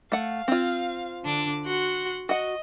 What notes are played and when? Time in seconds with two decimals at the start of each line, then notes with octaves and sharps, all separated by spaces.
0.12 A3 F5 F#5
0.48 C4 F4
1.23 D3 D4 D6
1.66 F#4 F#5 C6
2.29 F#4 D#5 F#5